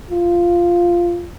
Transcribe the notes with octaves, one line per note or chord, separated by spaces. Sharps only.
F4